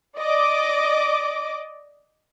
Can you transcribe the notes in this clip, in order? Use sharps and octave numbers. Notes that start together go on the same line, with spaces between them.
D5 D#5 D6